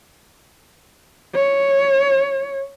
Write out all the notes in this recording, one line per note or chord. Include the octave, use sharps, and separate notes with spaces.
C#5